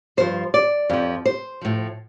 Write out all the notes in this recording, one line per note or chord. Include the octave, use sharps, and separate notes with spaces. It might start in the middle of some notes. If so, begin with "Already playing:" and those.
G2 F3 C5
D5
F2 F3
C5
A2 F3